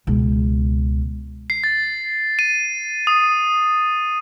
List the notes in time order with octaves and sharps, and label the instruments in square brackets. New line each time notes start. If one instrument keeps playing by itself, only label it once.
[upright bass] C#2 B2
[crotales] C7
A6
D#7
D#6